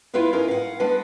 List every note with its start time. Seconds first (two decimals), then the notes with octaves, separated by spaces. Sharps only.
0.14 E4 F4 B4 E5 F5
0.33 C#4 D#4 A#4 F5
0.48 F5 F#5
0.80 G#3 B3 D4 B4 F#5